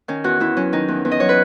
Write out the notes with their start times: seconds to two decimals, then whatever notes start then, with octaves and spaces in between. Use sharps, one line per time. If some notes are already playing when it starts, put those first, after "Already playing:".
0.08 D#3 C#4
0.24 E2 F#4
0.40 E2 E4
0.57 F#3 C#4
0.73 D#3 D#4
0.88 E2
1.05 E2
1.12 D#5
1.20 F#3 C#5
1.29 B4